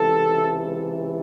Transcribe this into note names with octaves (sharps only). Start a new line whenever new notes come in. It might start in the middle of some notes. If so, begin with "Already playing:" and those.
Already playing: C#2 C3 E3 A4